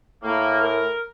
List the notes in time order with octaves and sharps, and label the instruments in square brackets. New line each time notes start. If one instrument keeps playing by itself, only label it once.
[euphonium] A2 [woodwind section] A#3
[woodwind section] A#4